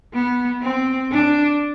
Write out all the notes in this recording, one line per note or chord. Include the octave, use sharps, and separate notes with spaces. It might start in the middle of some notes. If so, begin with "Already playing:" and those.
B3
C4
D4